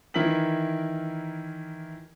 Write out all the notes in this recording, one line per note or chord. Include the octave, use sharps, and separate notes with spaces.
D#3 E3 E4 A#4 B6 F#7